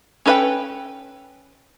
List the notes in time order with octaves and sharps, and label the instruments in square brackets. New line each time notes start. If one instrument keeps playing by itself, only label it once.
[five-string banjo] C#4 A4 B4 E5 G5